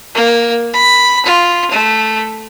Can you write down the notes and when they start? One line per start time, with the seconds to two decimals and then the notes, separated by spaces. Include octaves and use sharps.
0.15 A#3
0.74 B5
1.26 F4
1.71 A3